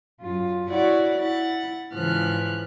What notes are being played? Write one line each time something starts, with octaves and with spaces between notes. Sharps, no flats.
F#2 F4
E4 F#4 C#5 D5 F#5
E4 F#5 A6
G#2 C#3 E3 F3 F6 F#6